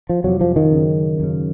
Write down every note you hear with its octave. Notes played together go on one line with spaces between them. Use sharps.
F3
F2 C3 F#3
F3
D#3
F#2 C#3
F#2 C#3